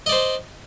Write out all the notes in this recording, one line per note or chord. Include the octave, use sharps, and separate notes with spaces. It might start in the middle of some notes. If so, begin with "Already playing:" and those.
C5 D5 D#5